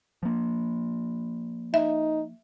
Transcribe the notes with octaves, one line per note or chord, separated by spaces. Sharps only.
F3 A#3
D#4 E5